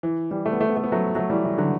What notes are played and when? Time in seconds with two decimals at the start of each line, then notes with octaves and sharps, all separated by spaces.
0.03 E3
0.31 E3 G3
0.46 A3
0.52 B3
0.61 A3
0.69 B3
0.77 A3
0.84 B3
0.92 F#3 A3
1.15 F#3 A3
1.30 E3 G3
1.44 E3
1.58 D3 F#3